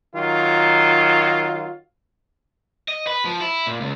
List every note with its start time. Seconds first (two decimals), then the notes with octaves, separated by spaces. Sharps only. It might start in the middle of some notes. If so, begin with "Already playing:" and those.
0.14 D#3 F#3 F4
2.88 D#5
3.07 B4
3.25 F3
3.41 E4
3.67 A#2
3.81 C#2